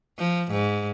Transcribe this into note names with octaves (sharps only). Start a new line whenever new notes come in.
F3
G#2